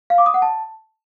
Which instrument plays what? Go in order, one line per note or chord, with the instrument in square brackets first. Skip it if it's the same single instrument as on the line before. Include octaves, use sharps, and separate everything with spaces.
[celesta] F5
D6
D#6
F#5
A5